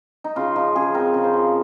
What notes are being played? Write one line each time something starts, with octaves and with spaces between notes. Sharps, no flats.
D#4
C#3 F4
F3 D#4
C#3 G#4
C4 A#4
C#3
C5
F3